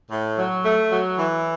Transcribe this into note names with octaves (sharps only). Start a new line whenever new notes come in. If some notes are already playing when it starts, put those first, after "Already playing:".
A2
F#3
A3
F#3
E3